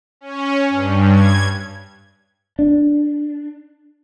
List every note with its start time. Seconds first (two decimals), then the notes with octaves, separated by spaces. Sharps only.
0.21 C#4
0.70 G2
1.14 G#6
2.59 D4